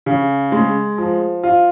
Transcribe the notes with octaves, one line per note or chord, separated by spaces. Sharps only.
C#3
G#3
F3
F4